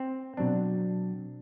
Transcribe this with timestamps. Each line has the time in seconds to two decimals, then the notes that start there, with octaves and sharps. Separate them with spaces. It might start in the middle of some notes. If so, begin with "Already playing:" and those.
Already playing: C4
0.37 B2 F#3 C4 D4